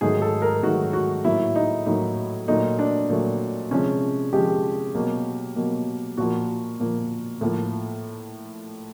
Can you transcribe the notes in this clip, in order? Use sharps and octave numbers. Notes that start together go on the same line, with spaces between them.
G#2 D#3 F#3 A3 G#4
A4
A#4
G#2 D#3 F#3 A3 F#4
F#4
A2 F#3 A#3 E4
D#4
A2 F#3 A#3 D#4
A#2 F#3 A3 D#4
D4
A#2 F#3 A3
C3 F3 G#3 C#4
C3 F3 G#3 G4
B2 F#3 A#3
B2 F#3 A#3
A#2 F3 A#3 F#4
A#2 F3 A#3
A2 F3 A#3